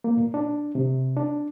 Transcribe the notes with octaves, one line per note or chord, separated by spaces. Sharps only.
A#3
A#2
D4
C3
D4